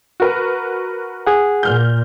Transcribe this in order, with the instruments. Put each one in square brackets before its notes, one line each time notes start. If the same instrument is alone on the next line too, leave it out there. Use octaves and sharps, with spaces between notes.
[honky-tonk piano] F#4 A#4 B4
[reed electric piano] G#4 F#5
[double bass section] A#2 [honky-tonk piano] F6 G6